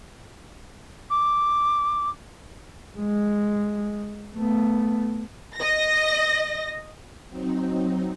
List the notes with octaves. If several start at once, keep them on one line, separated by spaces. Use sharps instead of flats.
D6
G#3
A3 B3
D#5 A#6
F#3 C4 D#4